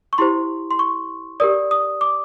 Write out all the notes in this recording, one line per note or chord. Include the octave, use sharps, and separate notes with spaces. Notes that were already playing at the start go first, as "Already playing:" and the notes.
C#6
E4 G4 C5 C6
C6
C#6
G4 A#4 D5 D#6
D#6
D6